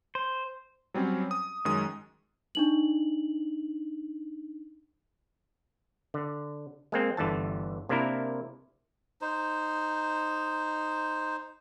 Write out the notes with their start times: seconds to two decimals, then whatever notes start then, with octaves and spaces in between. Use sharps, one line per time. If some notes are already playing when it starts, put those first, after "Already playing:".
0.15 C5
0.94 F#3 G3 C4 C#4
1.31 D#6
1.65 F#2 D#3 G#3 D#6
2.55 D4 D#4 F#7
6.14 D3
6.92 G#3 A#3 C4
7.17 G1 D3 E3 A5
7.89 C3 A#3 D4 E4 A#4
9.21 D#4 C5